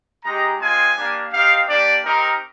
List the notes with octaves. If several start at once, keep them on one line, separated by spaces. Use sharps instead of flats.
G#3 D#4 G4 A#5
G#3 C4 F4 G#5
A#3 D4 G4
C4 D#4 G4 F5
A#3 D4 G4 D5
C4 D#4 G4 A#4